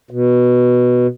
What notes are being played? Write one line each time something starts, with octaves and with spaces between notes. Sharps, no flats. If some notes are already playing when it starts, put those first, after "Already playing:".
B2